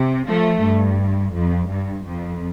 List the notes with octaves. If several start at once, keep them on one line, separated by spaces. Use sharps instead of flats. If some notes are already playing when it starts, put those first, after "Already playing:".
Already playing: C3
F3 A3
G2
F2
G2
F2